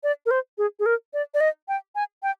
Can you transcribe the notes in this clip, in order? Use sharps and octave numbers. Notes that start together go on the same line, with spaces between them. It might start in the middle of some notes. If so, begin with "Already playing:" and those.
D5
A#4
C5
G#4
G#4
A#4
D5
D5
D#5
G5
G#5
G5